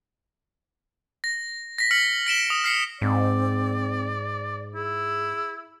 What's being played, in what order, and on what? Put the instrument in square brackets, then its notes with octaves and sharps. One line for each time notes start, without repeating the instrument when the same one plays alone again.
[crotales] A#6
A#6 B6
F6 B6 C#7 F#7
B6 D7 E7 G7
D#6
F6 C7 C#7
[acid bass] G#2 [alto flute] C4 [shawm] D5
[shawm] E4 [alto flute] G#4